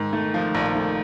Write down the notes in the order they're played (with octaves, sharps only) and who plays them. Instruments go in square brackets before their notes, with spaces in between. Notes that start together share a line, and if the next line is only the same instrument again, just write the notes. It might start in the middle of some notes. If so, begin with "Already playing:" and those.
Already playing: [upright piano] G#2 [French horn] D#3
[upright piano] A3
F3
A#1
A3